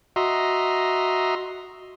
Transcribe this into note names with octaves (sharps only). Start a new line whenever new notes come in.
F#4 D#5 E5 A#5 C6